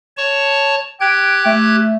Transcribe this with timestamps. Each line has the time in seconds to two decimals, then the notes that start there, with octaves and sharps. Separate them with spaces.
0.17 C#5 A5 C#6
1.01 G4 G5 F#6 G#6
1.45 A3